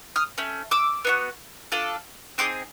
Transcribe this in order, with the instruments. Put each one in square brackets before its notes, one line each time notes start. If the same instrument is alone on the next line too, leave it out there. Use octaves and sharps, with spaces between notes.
[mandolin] D#6 F6
A3 C#4
D6 E6
B3 D#4 F#4
D4 F4 A4
C4 D#4 G#4 C6 D6